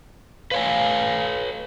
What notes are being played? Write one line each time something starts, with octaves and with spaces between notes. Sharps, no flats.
B4 C#5 F5 G#5